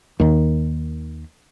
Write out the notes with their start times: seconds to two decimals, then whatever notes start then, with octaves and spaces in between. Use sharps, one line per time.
0.20 D#2 D#3